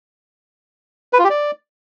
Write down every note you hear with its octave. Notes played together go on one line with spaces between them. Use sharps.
B4
F4
G4
D5